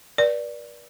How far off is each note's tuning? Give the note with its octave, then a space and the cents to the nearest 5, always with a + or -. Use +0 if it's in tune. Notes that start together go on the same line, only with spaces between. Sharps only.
B4 -45 D5 +0